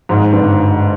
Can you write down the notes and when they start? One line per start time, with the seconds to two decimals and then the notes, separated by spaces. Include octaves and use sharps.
0.09 G#1 G#2
0.32 G1 G2